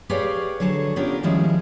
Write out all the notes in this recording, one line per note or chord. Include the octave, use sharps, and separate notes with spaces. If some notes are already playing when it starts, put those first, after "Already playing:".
G4 G#4 B4 C#5 D5 F5
D3 F#3 G#4 A4 C#5
B3 C#4 D4 F4 G4 A#4
D#3 F3 G3 G#3 C#4 E4